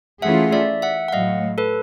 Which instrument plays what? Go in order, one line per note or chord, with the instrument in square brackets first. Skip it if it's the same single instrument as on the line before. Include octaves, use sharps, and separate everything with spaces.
[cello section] E3 A3 C#4 F4 G#4 [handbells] E5 F#5
[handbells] D5 E5
E5 F#5
F#5
[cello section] A2 F#3 A3 [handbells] D#5 F5
[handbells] A4 B4